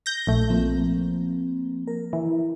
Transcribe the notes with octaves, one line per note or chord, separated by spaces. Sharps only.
G6 A#6
A#1 A3
F3 A#3 C4
A#4
E3